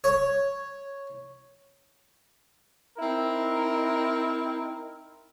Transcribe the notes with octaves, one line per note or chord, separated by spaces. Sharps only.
C#5
C4 D#4 E4 A#4